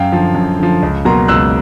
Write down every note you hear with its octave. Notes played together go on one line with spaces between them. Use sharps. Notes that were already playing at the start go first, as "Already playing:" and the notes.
Already playing: F#2 F5 G5
D3 F3
F#2
D3 F3
C#2
B2 F#3 A#3 A#5 C6
C#2 E6 F#6